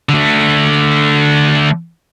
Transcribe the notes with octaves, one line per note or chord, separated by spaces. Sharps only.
D3 A3